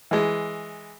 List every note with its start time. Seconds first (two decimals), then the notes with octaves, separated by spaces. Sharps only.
0.11 E3 G#3